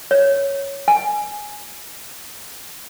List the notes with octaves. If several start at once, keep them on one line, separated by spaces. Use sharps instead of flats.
C#5
G#5